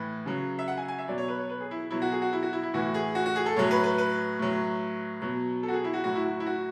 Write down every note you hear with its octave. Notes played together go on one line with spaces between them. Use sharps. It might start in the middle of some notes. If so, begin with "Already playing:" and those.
Already playing: A2 E3 B4
C#3 F#3
E5
F#5
G#5
G#5
E5
B2 F#3 D5
C#5
B4
C#5
B4
G#4
E4
B2 F#3 E4
F#4
G#4
F#4
E4
F#4
E4
E4
A2 E3 F#4
G#4
F#4
F#4
G#4
A4
A2 F#3 C#5
B4
B4
B4
A2 F#3
B2 F#3
A4
F#4
G#4
E4
F#4
A2 F#3 F#4
E4
F#4
E4
F#4